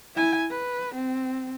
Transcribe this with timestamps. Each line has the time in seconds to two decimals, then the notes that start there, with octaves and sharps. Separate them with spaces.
0.15 E4 G#5
0.51 B4
0.95 C4